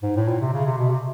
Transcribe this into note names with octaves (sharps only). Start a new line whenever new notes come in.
G#2
A2
A#2
C3
C#3
C3
B2
C3